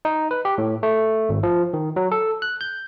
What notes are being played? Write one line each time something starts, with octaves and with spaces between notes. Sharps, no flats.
D#4
B4
G4
A2
A3
G#1
F3
D#3
F#3
A4
F#6
G6